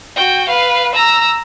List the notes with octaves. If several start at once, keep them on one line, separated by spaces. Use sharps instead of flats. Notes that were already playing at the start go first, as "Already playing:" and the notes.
F#4 G5
B4 F5
A#5 E6